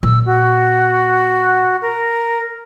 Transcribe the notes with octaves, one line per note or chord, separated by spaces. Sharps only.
A#2 E6
F#4
A#4